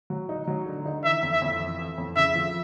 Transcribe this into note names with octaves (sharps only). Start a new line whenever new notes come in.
F#3
D#4
F#3
D3
D#4
E3 E5
F2
E5
F2
E3
E3
F2
C#3 E5
F3